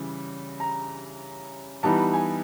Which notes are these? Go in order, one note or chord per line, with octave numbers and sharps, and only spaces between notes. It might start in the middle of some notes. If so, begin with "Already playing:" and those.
Already playing: C#3 E3 G3
A#5
E3 G3 B3 D#4 A5
G#5